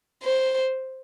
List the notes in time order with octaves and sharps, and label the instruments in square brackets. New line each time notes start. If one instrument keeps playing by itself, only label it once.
[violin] C5